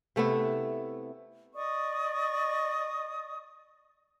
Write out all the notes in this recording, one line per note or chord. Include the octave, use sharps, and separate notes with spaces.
C3 A3 B3 E4
D5 D#5 C#6 D#6